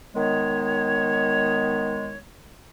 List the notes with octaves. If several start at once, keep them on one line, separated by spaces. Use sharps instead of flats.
D#3 G#3 B3 C#5